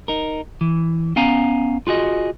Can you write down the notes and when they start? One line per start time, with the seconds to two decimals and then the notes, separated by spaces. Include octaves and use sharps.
0.08 D#4 A#4
0.61 E3
1.16 B3 C#4 F5 G#5 A#5
1.87 F4 F#4 G#4 D#5